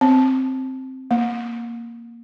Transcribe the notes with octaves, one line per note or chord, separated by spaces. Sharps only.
C4
A#3